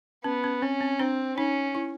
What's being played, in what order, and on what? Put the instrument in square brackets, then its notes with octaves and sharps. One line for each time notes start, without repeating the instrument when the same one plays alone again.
[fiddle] B3 [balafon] C#4
[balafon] C#4
[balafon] C4 [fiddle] C#4
[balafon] C4
[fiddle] C4 [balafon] D4
[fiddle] C#4 [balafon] D#4
[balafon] E4